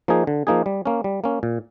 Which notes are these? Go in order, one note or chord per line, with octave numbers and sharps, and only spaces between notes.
F3 A#3 D#4 G#4
D3
F3 A#3 D#4 G#4
G3
A#3 C#4
G3
A#3 C#4
A#2